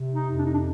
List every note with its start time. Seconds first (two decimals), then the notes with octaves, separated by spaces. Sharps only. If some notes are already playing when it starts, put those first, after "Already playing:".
Already playing: C3
0.13 D#4
0.26 F2
0.38 D4
0.45 D#4
0.53 D4